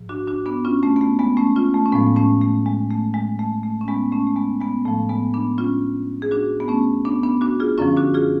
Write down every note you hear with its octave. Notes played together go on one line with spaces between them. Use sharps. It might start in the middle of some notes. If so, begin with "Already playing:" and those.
Already playing: G#2 F3
D4 F#4
D4 F#4
B3 D4
C#4 F4
A3 C#4
B3
A3
G#3 B3
A3 C#4
C#4 F4
A3
C#4
A2 F3 G#3 B3
A3 C#4
A3
G#3
A3
G#3
A3
A3
C#4
G#3 B3
A3 C#4
A3
G#3 B3
G#3 B3
A2 F3 A3
G#3 B3
B3 D4
C#4 F4
G#4
D4 F#4
B3
A3 C#4
B3 D4
B3 D4
D4 F#4
F4 G#4
F#2 D3 F3 C#4 F4
D4 F#4
F4 G#4